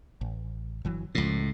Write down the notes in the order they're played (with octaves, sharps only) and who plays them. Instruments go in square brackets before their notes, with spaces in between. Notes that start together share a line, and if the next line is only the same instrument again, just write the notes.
[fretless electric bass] A1
G1 E3 F#3
[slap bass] C#2 A2 [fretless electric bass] F3